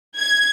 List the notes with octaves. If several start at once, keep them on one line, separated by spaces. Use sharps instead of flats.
G#6